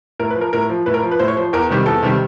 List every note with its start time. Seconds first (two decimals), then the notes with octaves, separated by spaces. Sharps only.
0.19 A2 A#4
0.30 B4
0.36 F3
0.41 A#4
0.53 A2 A#4
0.69 F3
0.86 A2 B4
0.94 A#4
1.03 F3
1.11 B4
1.19 A2 C5
1.28 C#5
1.37 F3 C5
1.53 E2 A#4
1.70 C3 D#3 G3
1.86 E2 A4
2.03 C3 D#3 G3